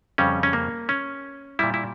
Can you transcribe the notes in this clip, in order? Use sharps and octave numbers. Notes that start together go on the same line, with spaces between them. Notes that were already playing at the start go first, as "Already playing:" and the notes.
F2 C#3 G3 C#4
C#4
A#3
C#4
A#2 G3 E4
E4